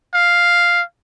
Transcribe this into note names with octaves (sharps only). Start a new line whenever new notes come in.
F5